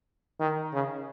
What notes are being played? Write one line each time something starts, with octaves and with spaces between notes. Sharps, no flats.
D#3
C#3